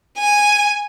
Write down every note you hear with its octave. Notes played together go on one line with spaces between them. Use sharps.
G#5